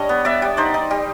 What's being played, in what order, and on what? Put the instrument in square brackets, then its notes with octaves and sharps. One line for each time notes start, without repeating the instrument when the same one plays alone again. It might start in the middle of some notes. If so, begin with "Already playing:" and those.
Already playing: [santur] G3 D4 C#5 D#5
B3
B3 D5 E5
G3
D#4 C5 D5
D#4
G3